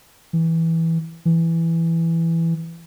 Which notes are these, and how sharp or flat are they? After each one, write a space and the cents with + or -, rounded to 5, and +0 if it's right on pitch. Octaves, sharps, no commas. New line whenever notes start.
E3 -10
E3 +5